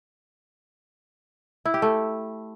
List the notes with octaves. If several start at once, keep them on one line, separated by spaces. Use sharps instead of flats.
E4
G4
A3